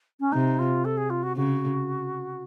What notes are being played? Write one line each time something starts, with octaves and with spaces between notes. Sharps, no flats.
C#4
C3 D#4
F4
A4
G#4
F4
F#4
C#3 F#4